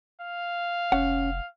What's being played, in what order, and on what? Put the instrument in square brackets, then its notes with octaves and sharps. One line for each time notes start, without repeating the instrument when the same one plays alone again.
[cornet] F5
[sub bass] F1 [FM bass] C#4 [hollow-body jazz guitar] F#5